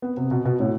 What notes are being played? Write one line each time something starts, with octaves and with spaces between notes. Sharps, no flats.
B3
C3
B2
B2
A2